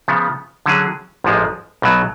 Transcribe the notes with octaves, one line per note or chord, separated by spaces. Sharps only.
C#3 F3 B3
D3 F#3 C#4 G#4
A1 G#2 F3 G#3
B1 B2 F#3